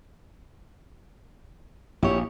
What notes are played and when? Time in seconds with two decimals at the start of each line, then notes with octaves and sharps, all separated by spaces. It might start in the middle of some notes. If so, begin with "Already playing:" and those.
2.03 A#1 E4 G4 C#5